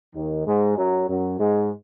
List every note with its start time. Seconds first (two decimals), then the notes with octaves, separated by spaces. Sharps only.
0.15 D#2 D#3
0.46 G#2 G#3
0.77 F#2 F#3
1.08 F#2 F#3
1.39 G#2 G#3